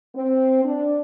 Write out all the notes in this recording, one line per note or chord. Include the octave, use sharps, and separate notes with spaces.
C4
D4